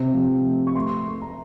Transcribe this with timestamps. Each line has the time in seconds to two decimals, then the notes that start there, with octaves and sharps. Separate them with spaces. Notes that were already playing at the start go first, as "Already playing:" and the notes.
Already playing: C3 C4
0.14 F3
0.45 A3
0.67 C#6
0.76 A3 C6
1.07 A3
1.22 A#5